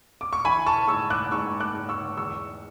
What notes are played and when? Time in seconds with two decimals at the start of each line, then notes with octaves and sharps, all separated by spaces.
0.21 D6
0.33 C#6
0.45 E3 G#5 B5
0.66 A5 C#6
0.88 G#2 C#6 E6
1.10 D6 F#6
1.31 G#2 C#6 E6
1.60 D6 F#6
1.74 G#2
1.89 C#6 E6
2.17 E2 C#6 E6